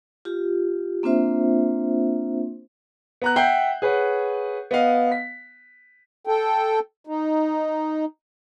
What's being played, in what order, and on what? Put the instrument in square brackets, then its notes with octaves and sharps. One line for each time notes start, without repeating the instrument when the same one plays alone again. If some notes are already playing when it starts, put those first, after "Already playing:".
[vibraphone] F4 G4
A#3 C4 D4 F4 C5 E5
[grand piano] B3 A#5 F#6
E5 F#5 G5 G6 C7
G#4 B4 C#5 F#5
B3 D#5 F5
B6
[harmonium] A4 G5
D#4